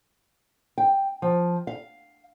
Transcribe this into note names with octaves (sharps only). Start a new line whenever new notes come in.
G5
F3
F5